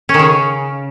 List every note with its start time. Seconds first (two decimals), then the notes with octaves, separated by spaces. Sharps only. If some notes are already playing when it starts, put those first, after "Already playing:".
0.09 C#4
0.14 D#3
0.19 C#3